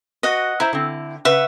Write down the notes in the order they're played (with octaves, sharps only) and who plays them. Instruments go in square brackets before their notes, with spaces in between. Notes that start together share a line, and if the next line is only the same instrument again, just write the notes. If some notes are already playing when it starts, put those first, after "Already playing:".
[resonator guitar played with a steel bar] F#4 B4 [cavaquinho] D#5 F#5
[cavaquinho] E4 [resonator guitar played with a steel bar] C5 E5 A#5
[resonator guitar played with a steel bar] D3 C4
[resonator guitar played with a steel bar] C#3 [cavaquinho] B4 E5 F#5